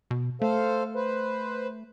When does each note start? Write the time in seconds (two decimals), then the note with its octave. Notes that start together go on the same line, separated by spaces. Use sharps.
0.11 B2
0.42 A3 A4 C5 F5
0.95 B4 C5